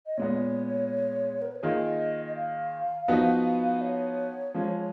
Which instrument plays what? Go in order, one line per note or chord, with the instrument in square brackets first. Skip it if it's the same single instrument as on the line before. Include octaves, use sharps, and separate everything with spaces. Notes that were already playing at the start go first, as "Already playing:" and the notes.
[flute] D#5
[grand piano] A#2 G#3 B3 [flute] C#5
[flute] A#4
B4
C#5
[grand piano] D#3 A#3 F4 G#4 [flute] D#5
[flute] D#5
F5
[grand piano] F3 B3 D#4 F#4 B4
[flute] C#5
[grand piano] F3 G#3 C#4